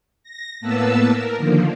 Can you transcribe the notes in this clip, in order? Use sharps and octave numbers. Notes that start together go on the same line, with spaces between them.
A#6
A2 A#3 B3 B4 A5 E6
A#4
D3 D#3 F3 A#3